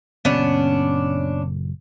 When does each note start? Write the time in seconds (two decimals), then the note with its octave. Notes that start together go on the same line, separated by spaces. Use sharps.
0.25 F#1 A#2 B3 C#4 D4